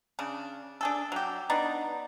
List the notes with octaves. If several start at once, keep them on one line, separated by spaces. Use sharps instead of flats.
C#3 D4
D4 G#4 A4
F#3 G4
B3 D4 D#4 D5